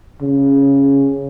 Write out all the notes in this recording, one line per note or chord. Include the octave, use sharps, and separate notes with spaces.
C#3